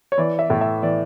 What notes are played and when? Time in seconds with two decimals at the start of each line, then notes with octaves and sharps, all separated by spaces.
0.12 C#5
0.18 E3 D5
0.39 E5
0.50 A2
0.61 E5
0.83 E3 D5